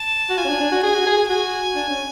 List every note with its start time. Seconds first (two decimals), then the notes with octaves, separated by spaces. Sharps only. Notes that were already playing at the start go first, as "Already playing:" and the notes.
Already playing: A5
0.30 F#4
0.38 F4 G#5
0.45 C#4
0.49 D4
0.61 D4
0.72 F#4
0.83 G#4 G#5
0.94 F#4
1.07 G#4
1.17 G#4
1.29 F#4 G#5
1.75 D4
1.89 C#4